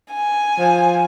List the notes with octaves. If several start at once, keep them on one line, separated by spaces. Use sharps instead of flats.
G#5
F3